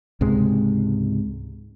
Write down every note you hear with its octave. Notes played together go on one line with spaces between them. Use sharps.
C#2 G#2 C3 G#3